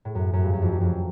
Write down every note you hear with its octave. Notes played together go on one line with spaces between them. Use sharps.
A2
F#2
F#2
G2
F#2
F2
F#2
F2